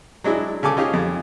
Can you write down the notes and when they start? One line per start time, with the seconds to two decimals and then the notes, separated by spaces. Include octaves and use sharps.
0.24 F#3 G#3 D4 E4
0.63 C#3 A4 G#5 D6
0.77 C#4 D#4 F4 G4 G#4
0.93 F2